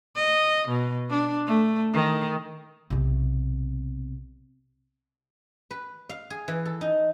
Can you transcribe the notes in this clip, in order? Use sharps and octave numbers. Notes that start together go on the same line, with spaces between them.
D#5
B2
D4
A3
D#3
B1 C3
B4
F5
G#4
E3
A4
D#4